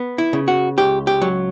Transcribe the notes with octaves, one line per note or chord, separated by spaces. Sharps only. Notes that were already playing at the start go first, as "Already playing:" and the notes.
Already playing: B3
E4
C#3
F#4
C#2 G4
G4
F#3